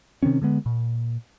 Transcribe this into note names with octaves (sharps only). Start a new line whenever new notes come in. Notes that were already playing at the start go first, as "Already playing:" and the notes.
C3 D#3 C4 C#4
D3 G#3 B3
A#2